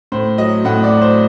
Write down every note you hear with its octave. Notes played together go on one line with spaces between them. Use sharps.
A2 C5
F#3 D#5
A2 F#5
D5
F#3
C5